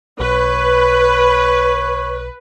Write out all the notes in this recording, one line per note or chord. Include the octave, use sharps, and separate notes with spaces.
B1 B4 C#5